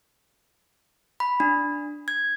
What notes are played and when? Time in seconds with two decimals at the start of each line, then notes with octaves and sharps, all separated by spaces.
1.20 B5
1.40 D4
2.08 G#6